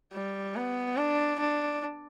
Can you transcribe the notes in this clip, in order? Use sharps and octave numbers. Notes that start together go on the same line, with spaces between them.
G3
B3
D4
D4